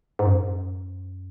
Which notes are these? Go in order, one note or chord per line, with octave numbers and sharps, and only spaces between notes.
G#2
F#2